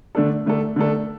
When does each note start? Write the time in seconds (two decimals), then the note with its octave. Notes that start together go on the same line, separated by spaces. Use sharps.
0.15 D3 A3 D4 A4
0.46 D3 A3 D4 A4
0.76 D3 A3 D4 A4